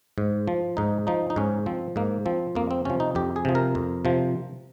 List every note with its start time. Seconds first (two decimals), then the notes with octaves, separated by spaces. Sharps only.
0.18 G#2
0.48 F3
0.77 G#2 D#4
1.07 F3 D#4
1.30 D#4
1.36 G#2 C#4
1.66 F3 C4
1.96 G#2 A#3
2.26 F3 C4
2.55 F2 A#3
2.71 C4
2.85 C3 F3 C#4
3.00 D#4
3.15 F2 G4
3.36 G#4
3.45 C3 F3
3.55 A#4
3.75 F2
4.05 C3 F3